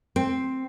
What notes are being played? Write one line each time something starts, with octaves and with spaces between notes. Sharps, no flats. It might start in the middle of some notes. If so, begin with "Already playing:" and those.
C4